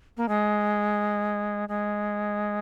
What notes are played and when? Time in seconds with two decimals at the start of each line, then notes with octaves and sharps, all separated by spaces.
0.17 A#3
0.29 G#3
1.69 G#3